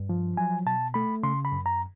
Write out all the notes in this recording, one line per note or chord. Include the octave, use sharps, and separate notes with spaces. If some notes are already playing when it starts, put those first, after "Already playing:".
Already playing: G2
F3
F#3 G#5
B2 A5
A3 B5
C#3 C6
B5
F#2
A#5